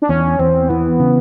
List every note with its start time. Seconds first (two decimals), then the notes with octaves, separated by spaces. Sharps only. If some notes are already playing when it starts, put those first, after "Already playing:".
0.02 D4
0.09 E2 C#4
0.39 E2 C4
0.69 E3 B3
1.00 C#3